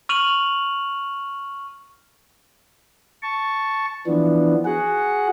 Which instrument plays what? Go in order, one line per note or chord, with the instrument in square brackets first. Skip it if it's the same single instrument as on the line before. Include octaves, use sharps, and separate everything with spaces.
[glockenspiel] C#6 F6 D#7 F7 F#7
[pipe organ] A5 C#6
E3 F3 B3 D4
F#4 G#4 F#5